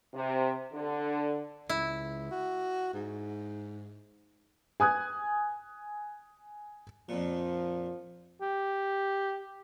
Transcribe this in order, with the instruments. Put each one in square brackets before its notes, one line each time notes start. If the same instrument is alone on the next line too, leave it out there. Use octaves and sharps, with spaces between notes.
[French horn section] C3
D3
[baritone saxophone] C#2 [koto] E4
[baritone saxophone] F#4
G#2
[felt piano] G#5 D#6 F#6 G#6
[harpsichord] F2 A#2 [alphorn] F3
[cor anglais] G4